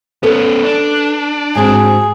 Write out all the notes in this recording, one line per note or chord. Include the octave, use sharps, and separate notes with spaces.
B3 C#4 A4 B4
D4
G#2 C4 F#4 G#4